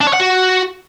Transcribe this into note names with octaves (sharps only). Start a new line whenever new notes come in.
D4
C#5
F#5
F#4